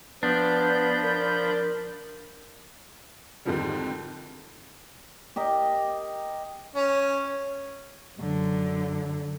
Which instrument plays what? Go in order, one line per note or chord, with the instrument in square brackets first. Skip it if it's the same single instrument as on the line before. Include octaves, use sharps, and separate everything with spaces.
[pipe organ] F3 B5 G6 [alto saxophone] B3 [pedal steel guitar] D4
[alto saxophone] A#4
[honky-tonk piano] F2 G#2 D3 D#3 F3 G3
[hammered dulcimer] G4 A#4 D#5
[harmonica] C#4
[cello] F#2 D3